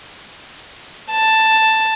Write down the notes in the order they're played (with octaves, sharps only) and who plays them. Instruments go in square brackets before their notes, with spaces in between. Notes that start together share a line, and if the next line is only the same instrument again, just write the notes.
[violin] A5